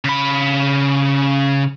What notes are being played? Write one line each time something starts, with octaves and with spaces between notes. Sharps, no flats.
C#3 B5